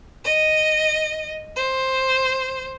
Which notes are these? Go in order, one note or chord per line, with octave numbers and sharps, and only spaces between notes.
D#5
C5